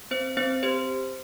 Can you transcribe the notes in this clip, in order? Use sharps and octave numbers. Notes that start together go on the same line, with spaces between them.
C4 C5
C4 C5
G4 C5